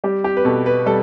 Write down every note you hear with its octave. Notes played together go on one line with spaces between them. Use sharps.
G3 G4
G4
B4
B2 A4
B4
G3 A4